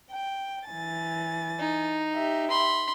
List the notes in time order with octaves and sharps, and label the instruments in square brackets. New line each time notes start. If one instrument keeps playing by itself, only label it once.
[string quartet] G5
E3 G#5 A6
[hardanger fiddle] D#4
[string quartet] G4 E5
[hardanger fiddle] B5 C6